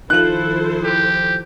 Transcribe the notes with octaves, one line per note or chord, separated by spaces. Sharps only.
D#3 F3 E4 A4 C5 F#6 F#7
G4